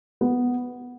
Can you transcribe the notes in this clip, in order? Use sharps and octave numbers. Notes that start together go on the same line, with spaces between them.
B3